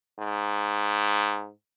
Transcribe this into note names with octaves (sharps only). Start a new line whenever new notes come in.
G#2